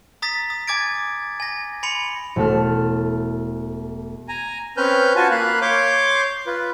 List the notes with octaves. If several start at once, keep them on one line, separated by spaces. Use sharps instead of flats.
A#5 D#6 A6 B6
D#6
G#5 D6 G#6 A6 D7
G#5 A#6
G#5 B5 C6 C#7 F7
E1 A3 A4 F6
G#5 A#5
C4 C#4 B4 F6 G6
F4 F#4 G#5 A5
A#3 F5 B5 F#6
C#5 C6 D6 G6
F4 B4